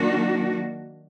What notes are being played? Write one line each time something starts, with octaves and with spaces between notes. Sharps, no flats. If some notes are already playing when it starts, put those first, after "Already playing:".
Already playing: D#3 F#3 A#3 D4 F#4